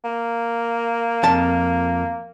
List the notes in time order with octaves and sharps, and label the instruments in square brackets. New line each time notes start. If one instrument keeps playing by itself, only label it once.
[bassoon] A#3
[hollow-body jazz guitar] F2 A5